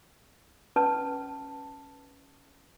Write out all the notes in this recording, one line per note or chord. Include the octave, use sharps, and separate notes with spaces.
C#4 B4 A5